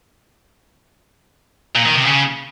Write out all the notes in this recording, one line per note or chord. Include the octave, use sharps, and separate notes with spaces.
A#2
D#3
C3
C#3